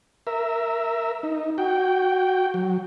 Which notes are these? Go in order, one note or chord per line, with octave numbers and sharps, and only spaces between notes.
A#4 E5
D#4
F#4 G5
F#3